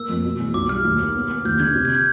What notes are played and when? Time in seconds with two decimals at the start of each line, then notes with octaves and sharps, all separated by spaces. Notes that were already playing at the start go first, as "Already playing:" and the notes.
Already playing: A#3 E6
0.09 F2
0.24 B2
0.39 E2
0.54 B1 D6
0.69 G3 F6
0.85 D#2
1.00 A#3
1.15 B3
1.30 B3
1.44 D#2 G6
1.60 D3 G#6
1.75 C3
1.85 G#6
1.95 G6